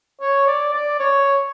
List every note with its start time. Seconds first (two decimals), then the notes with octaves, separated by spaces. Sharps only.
0.21 C#5
0.47 D5
0.73 D5
1.00 C#5